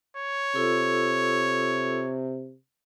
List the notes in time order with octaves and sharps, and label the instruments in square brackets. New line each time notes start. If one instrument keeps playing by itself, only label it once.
[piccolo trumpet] C#5
[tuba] C3 [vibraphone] F4 A4 E6